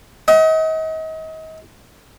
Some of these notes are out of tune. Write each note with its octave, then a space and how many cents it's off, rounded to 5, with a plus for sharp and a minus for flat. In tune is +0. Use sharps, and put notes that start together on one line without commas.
D#5 +35 F#5 +45